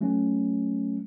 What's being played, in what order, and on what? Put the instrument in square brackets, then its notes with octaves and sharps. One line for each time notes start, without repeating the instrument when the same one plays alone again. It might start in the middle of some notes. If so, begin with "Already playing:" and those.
[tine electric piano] F#3 A3 C#4